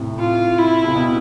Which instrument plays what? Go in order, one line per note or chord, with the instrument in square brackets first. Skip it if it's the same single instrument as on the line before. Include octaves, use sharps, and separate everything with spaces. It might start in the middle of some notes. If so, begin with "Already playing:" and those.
Already playing: [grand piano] A2 C3
[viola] F4
E4
[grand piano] C3
B2